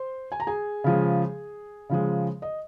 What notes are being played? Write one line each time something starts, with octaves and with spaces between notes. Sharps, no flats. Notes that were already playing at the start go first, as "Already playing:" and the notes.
Already playing: C5 C6
G#5
A#5
G#4 G#5
C#3 F3 G#3
C#3 F3 G#3
D#5